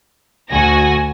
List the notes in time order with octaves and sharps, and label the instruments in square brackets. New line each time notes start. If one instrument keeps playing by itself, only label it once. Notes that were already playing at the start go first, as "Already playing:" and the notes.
[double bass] D2 [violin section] F#4 G#5 A#6